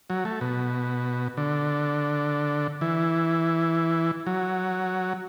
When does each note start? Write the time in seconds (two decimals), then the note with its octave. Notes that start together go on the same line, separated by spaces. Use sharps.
0.10 F#3
0.25 A3
0.41 B2
1.37 D3
2.81 E3
4.27 F#3